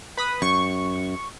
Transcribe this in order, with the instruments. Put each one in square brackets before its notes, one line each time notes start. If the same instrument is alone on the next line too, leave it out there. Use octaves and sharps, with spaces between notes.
[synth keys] B4 B5 D#6
[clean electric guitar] F#2 [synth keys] C#6